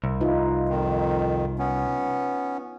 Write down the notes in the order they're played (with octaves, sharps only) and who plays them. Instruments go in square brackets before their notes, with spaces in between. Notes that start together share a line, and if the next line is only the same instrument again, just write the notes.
[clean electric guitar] C2
[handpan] D#4 F4 B4
[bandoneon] F2 D#3
B3 C#4